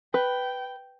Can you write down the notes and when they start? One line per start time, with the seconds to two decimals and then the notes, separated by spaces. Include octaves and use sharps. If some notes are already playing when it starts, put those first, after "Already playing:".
0.14 B4 G5